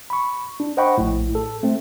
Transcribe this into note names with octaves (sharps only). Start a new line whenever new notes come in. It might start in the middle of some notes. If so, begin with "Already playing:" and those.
B5 C#6
D4
C5 D#5 F#5 G5 B5 C#6
A#1 A2
A4
A3 C4